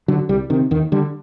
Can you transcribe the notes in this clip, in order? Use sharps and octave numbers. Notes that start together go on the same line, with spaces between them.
D3 F#3
C2 G3
C3 D#3
D#2 D#3
D3 G3